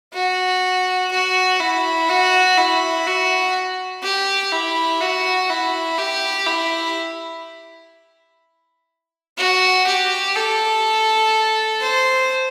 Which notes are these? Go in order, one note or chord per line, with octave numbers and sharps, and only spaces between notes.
F#4
F#4
E4
F#4
E4
F#4
G4
E4
F#4
E4
G4
E4
F#4
G4
A4
C5